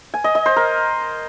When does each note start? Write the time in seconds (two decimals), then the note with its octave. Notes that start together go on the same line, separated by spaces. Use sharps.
0.14 G#5
0.24 D#5
0.35 D#5
0.46 C5
0.56 A#4